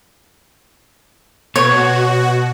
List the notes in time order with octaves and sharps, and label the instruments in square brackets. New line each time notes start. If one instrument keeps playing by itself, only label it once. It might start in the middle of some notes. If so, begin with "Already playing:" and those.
[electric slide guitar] B2 [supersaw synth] F#4 [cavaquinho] C#5